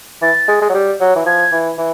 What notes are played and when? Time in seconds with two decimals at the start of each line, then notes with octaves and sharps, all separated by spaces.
0.22 E3 A6
0.48 G#3
0.62 G#3
0.70 F#3
0.75 G3
1.00 F#3
1.16 E3
1.26 F3 G#6
1.52 E3
1.78 E3